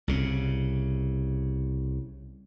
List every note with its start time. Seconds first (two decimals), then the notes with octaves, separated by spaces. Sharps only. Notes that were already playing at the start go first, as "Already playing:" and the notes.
0.08 C2 C#3